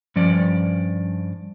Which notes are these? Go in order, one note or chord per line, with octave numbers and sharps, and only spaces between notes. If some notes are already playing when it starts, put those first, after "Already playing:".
G2 F3 C#4 D5